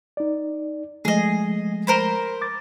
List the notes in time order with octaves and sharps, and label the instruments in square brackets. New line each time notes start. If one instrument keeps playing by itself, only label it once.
[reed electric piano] D#4 D5
[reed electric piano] F3 G#3 A3 [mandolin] G#4 D#5
[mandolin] A#4 C5 B5
[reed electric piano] D6 A6